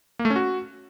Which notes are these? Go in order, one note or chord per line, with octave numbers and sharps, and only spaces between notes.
A#3
A3
C#4
F#4